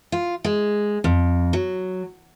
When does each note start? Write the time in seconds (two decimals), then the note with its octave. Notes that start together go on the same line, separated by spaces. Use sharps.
0.12 F4
0.44 G#3
1.04 F2
1.53 F#3